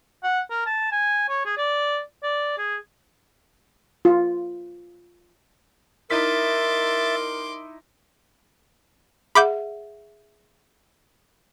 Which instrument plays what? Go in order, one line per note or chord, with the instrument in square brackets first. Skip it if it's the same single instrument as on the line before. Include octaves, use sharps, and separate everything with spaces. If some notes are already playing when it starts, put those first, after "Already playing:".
[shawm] F#5
A#4
A5
G#5
C#5
G#4
D5
D5
G#4
[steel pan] F4
[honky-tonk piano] D#4 E4 B6 [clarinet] A#4 [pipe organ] E5 A6 [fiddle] C6 D6
[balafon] G#4 E5 F#5 [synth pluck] B5 D6 G6